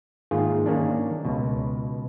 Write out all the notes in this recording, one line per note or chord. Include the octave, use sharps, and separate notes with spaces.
G#2 D#3 A#3 F4 G#4
D#3 A#3 C#4 D4
C#2 B2